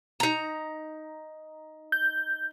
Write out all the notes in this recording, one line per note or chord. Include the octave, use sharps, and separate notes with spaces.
D#4 A#5
G6